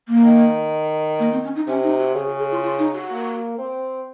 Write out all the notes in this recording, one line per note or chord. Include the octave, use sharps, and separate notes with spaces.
A#3
D#3
A#3
C4
C#4
D#4
C3 C#4
D#4
F#4
C#3 G#4
F#4
G#4
F4
F4
D#4
F#4
A#3
C4